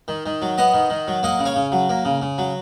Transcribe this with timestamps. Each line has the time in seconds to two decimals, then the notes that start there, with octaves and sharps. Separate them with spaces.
0.08 D#3
0.26 D#3
0.42 F#3
0.58 B3 D#5 F#5
0.74 D#3
0.90 D#3
1.08 F#3
1.23 A#3 D#5 F#5
1.39 C#3
1.45 C#5 F5
1.56 C#3
1.72 F#3
1.89 A#3
2.05 C#3
2.22 C#3
2.38 F#3